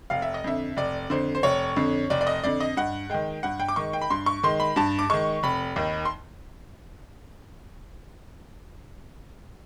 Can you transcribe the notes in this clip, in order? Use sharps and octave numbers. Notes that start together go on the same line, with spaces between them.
F1 F5
E5
D#5
F2 D3 E5
F1 D5
F2 D3 C5
C5
F1 C#5
F2 D3
F1 D5
D5
D#5
F2 D3 D5
D#5
G2 F#5
D#3 G#3 G5
G2 F#5
G5
D6
D#3 G#3 C#6
G5
B5
G2 C6
C#6
D#3 G#3 C6
B5
G2 A5
D6
D#3 G#3 C#6
F1 B5
D#2 D#3
C6